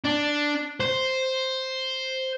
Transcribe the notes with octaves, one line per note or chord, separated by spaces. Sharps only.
D4
C5